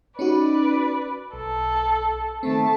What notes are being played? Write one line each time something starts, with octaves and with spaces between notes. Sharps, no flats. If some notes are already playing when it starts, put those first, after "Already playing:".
C#4 D#4 F#4 B4 D5
B1 A4
D#3 A3 C4 A5